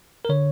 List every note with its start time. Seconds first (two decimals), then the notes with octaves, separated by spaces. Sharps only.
0.25 A#4
0.29 D3 C#5